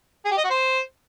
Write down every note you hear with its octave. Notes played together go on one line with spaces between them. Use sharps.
G#4
G4
D#5
F#4
C5